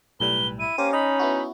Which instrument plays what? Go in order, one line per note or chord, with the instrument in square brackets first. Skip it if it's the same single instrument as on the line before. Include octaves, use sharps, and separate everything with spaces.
[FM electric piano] B1 A2 G3 [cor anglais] B4 [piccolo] G7
[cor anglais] E4 [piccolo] D#7
[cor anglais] A#3 [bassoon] C#4 [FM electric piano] G4 C5
[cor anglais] D#4 [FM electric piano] D#5 [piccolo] B5
[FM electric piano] B3 E4 F#4